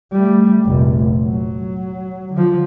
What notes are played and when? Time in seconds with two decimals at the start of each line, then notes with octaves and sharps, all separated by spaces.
0.12 G3 A3
0.64 F1 A#1
1.23 F#3
2.33 D3 F3